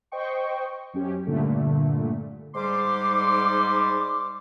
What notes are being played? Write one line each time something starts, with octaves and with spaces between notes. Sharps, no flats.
C5 D#5 G5 C#6
F#2 C#4 G4
G2 A#2 D3 A3
G#2 G3 C6 D6